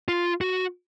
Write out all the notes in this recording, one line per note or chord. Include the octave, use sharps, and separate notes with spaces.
F4
F#4